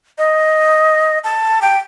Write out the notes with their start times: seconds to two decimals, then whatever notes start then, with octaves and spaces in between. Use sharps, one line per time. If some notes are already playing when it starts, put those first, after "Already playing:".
0.18 D#5
1.24 A5
1.62 G5